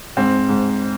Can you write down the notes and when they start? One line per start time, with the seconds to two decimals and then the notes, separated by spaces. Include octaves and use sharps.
0.17 G#2 C4
0.49 G#2